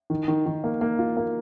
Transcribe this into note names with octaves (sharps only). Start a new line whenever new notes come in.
D#3
D#3
D#3
A#3
A#3
F4
A#3